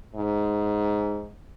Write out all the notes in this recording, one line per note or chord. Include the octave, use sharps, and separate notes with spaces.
G#2